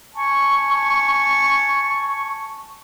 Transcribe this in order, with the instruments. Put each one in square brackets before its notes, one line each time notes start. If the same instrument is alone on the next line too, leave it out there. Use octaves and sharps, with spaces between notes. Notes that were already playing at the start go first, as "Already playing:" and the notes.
[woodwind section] G#5 A5 C#6